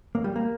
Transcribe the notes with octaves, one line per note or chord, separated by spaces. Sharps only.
A#3
G3
A#3